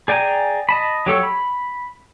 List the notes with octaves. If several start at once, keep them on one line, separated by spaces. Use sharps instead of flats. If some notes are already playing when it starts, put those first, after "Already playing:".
G#4 D5 G5 G#5 A#5
D#5 A5 B5
F#3 G4 A4 C#5
B5